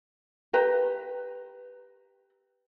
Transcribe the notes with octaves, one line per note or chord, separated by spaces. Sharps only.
G4 B4 A#5